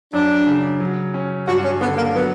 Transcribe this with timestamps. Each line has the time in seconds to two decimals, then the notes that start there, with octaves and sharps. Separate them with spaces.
0.13 F#2 D4
0.46 C#3
0.80 F#3
1.14 C#4
1.48 G2 F#4
1.64 C#4
1.81 D3 B3
1.98 A#3
2.15 F#3 B3